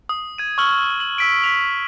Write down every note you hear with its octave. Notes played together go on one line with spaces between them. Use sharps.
D#6
G#6 D#7
C#6 E6 F6 F#7 G7
F#7
E6 B6 D7
B6 F7 F#7